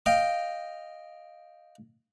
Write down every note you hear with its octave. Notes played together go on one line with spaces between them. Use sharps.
D#5 F5 G5